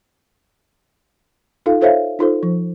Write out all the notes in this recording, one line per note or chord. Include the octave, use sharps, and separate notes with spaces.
D#4 F4 A4 F5
F4 A4 C5 C#5 E5 F5
D#4 F4 A4 C5
F3